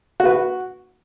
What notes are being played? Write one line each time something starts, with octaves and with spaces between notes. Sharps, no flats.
F#4
B4
F#4